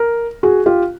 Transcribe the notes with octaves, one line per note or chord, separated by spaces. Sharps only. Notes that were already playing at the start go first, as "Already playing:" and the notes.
Already playing: A#4
F#4 G#4
F4 G4